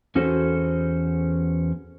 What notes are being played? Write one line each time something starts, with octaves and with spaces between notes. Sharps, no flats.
E2 C#4 F#4 A4 C5